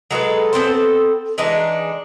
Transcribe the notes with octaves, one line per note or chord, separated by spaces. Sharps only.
F#3 G#3 A4 B4
B3 C4 A4 C5
E3 G#3 D4 D#4